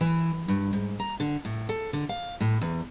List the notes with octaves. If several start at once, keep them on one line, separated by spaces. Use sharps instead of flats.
E3
G2
G#2
A#5
D3
A2
A4
D3
F5
A2
E2